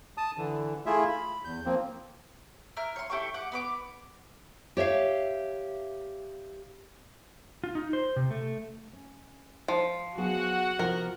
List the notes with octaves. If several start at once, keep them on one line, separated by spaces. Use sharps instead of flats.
A5 D#6
D3 E3
A3 E4 F4 G#4 E5
B5
E2 G6
F3 A#3 C4
E4 A#4 F6
C#5 C6
E4 G4 A4 C#6
F#5 D6
B3 B4 D6
G4 C#5 E5 F5
F4
D#4
C5
C3
A3
C#4
F3
F#3 B3 F#4 G#4 F#5
C3 F3 A#4